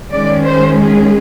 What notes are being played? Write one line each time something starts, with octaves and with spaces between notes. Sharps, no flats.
D#3 G#3 C#4 D5
C5
G#4